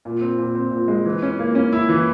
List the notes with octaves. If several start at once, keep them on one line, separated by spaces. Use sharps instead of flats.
A#2
C4
A#2
C4
A#2
G#3
E3
C#4
A#3
C#4
E4
E3